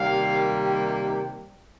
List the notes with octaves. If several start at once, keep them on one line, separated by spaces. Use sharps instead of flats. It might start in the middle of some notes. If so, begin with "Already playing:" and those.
Already playing: C3 D#3 G3 A#3 F5